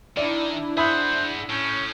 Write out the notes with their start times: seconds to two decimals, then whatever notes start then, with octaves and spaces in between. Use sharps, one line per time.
0.17 D#3 D4 E4 D5
0.77 G#4 C5 E5 F#5 B5 D#6
1.49 A2 C#4 G6